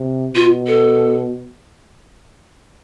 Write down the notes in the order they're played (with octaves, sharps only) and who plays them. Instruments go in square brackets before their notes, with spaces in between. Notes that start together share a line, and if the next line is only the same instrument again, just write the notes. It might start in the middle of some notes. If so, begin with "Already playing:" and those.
Already playing: [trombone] C3
[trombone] B2 [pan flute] F4
[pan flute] A4